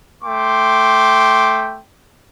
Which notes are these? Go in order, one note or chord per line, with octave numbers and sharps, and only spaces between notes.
A3 G5 C6 D6